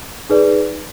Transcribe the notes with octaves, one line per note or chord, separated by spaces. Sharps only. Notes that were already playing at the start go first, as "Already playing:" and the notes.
D#4 G#4 B4 D5